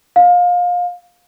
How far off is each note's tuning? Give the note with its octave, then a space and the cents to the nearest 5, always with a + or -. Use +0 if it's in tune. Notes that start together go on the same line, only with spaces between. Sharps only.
F5 +25